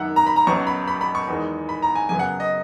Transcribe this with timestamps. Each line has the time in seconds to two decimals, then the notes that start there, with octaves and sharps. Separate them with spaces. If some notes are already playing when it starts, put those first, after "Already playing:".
Already playing: G#1 F#2 D#3 E5 F#5
0.16 A#5
0.26 B5
0.36 A#5
0.47 B1 B2 F#3 C#4 C#6
0.67 B5
0.88 B5
1.01 B5
1.15 C#6
1.28 E2 D#3 G#3
1.69 B5
1.82 A#5
1.95 G#5
2.09 F#2 C#3 F#3 B3 G#5
2.19 F#5
2.40 D#5